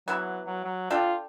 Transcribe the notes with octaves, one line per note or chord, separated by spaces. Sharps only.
E3 F#3 B3 E4
F#3
F#3
D4 F4 A4 G5